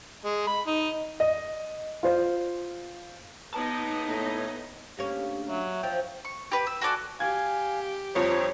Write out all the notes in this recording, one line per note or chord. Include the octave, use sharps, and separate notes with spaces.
G#3
B5
D#4
D#5
F4 C5
B3 D#4 C#5 D#5 A5
A2
D2 A#3 C#4 G4
F#3 E5
F3 G5
C#6
G4 B4
E6
F#4 A4 D5 G#5
G4 F5 G#5 G#6
G1 F2 F3 C5 C#5 A#5